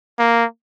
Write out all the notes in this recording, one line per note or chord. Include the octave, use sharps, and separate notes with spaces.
A#3